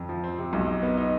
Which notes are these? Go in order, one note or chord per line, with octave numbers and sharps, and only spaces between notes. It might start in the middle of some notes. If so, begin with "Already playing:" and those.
Already playing: F2
F3
C4
C3
B1
D#4
B3
D#4